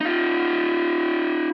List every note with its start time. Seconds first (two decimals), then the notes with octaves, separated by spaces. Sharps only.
0.01 D#4 F4